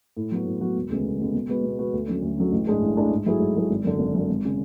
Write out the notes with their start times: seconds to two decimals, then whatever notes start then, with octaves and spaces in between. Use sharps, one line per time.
0.17 A2
0.32 F#3 B3 F#4
0.46 A2
0.61 F#3 B3 F#4
0.76 E1
0.90 D2 C#3 G#3 B3
1.05 E1
1.19 D2 C#3 G#3 B3
1.34 B2
1.49 G#3 B3 F#4 B4
1.63 B2
1.79 G#3 B3 F#4 B4
1.93 D2
2.08 D3 F#3 C#4
2.22 D2
2.38 D3 F#3 C#4
2.52 A1
2.67 A2 G#3 D4 G#4
2.82 A1
2.96 A2 G#3 D4 G#4
3.11 G#2
3.26 F#3 A3 E4 G#4
3.40 G#2
3.56 F#3 A3 E4 G#4
3.70 G#1
3.84 F#2 D3
3.99 G#1
4.14 F#2 D3
4.29 G#1
4.45 C#3